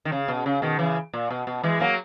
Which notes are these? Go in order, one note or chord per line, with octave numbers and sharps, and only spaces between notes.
D#3
C#3
B2
C#3
B2 D#3
C#3 E3
A#2
B2
B2
E3 G#3
F#3 A#3